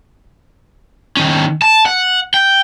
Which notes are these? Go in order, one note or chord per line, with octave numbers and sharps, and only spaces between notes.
D#3 C#4
A5
F#5
G5